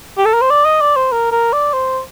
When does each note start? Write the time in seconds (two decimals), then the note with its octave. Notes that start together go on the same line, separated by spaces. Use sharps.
0.18 G4
0.25 A4
0.34 A#4
0.41 C5
0.51 D5
0.65 D#5
0.81 D5
0.96 C5
1.12 A#4
1.32 A#4
1.53 D5
1.74 C5